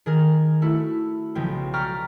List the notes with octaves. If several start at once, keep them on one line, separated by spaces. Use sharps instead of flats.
D#3 G#4 A#4
A3 E4 F#4
B1 C#3 F3 G#3 G5
D5 G5 A#5 C#6 F6 B6